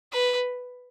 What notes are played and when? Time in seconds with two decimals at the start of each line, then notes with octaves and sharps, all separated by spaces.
0.13 B4